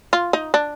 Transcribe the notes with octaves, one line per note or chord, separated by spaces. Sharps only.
F4
D#4
D4